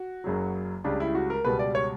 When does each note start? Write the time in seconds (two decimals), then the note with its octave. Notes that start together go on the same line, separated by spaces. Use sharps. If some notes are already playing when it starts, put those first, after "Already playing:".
Already playing: F#4
0.24 F#1 F#2 C#3 F#3
0.84 C#2 C#3 G3 D4
1.00 E4
1.15 F#4
1.30 A#4
1.44 C#2 B2 G3 B4
1.59 D5
1.75 C#5